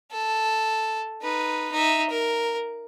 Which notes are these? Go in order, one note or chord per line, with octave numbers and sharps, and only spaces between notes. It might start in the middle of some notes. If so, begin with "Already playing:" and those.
A4
D#4 B4
D#4 E5
A#4